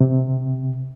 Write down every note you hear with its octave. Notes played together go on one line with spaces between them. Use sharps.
C3